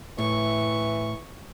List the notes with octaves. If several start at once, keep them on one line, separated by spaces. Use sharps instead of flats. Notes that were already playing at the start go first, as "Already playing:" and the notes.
A2 E3 C#6